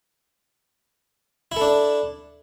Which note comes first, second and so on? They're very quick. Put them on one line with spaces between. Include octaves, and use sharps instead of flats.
E4 A4 D4